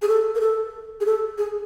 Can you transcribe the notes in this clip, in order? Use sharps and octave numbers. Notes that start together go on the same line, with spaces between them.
G#4
A4
A#4
A4
G#4
A4
G#4